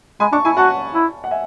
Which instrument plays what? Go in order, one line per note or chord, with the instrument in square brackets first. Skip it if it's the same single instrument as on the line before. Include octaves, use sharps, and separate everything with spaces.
[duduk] G#3 [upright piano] G#5 B5
[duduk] D4 [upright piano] A5 C#6
[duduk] E4 [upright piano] G#5 B5
[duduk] F#4 [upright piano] F#5 A5
[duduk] E4
[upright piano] F#5
E5 G#5